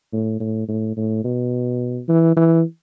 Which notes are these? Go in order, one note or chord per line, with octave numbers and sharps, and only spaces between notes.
A2
A2
A2
A2
B2
E3
E3